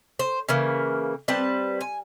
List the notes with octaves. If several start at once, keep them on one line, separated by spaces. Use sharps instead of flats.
C5
C#3 E3 A#3
G3 C4 B4 A5
G#5